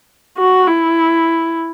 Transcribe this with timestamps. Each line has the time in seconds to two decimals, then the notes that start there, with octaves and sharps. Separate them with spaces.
0.38 F#4
0.68 E4